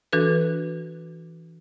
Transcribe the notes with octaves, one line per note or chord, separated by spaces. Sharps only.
E3 D4 F#4 A4 B4